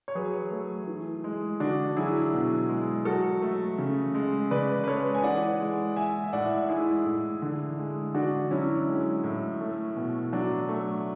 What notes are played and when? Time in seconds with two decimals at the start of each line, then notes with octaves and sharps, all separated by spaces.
0.08 C#5
0.15 F#3 G#4 B4
0.51 A3
0.87 E3
1.24 G#3
1.60 D3 D4 F#4
1.96 F#3 E4 G#4
2.33 B2
2.69 G#3
3.05 F#3 F#4 A4
3.42 A3
3.78 C#3
4.15 G#3
4.51 C#3 B4 D5
4.84 B4
4.87 G#3 A4 C#5
5.15 G#5
5.23 E3 D5 F#5
5.60 G#3
5.96 G#3 E5 G#5
6.24 E5
6.33 A2 D5 F#5
6.69 G#3 E4 G#4
7.06 A2
7.42 D3
7.78 G#3
8.14 D3 D4 F#4
8.51 F#3 C#4 E4
8.87 G#3
9.24 A2
9.60 A3
9.96 B2
10.32 F#3 D4
10.69 A3